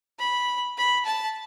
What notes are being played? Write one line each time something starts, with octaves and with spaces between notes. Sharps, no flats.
B5
B5
A5